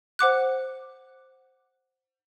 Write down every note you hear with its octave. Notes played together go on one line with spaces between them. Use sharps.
C5 F#5 D6 F#6